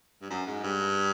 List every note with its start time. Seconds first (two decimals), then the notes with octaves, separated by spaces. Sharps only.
0.22 G2
0.30 F#2
0.47 G#2
0.64 G2